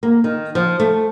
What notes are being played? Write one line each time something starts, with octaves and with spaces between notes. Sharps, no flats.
A#3
D#3
F3
A3